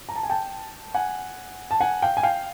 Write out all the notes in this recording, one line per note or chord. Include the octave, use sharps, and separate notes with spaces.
A#5
A5
G#5
G5 A5
F#5 G#5
A5
F#5 G#5
F5 G5
G#5
F5 G5